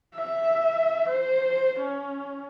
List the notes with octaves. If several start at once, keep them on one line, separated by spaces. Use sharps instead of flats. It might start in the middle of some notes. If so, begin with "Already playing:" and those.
E5
C5
C#4